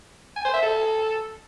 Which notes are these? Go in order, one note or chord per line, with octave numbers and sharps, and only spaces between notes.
G#5
C5
E5
A4